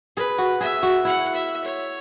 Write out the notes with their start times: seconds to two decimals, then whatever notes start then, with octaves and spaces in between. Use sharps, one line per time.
0.16 G#4 B4
0.38 F#4
0.61 G#4 E5
0.83 F#4
1.05 E4 F#5
1.35 E5
1.65 C#5